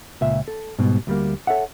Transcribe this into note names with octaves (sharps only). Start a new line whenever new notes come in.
C#2 A#2 E5
A4
G#2 B2 G3
D2 G3 A#3
A4 C#5 E5 F#5